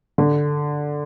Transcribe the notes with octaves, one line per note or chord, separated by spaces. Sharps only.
D3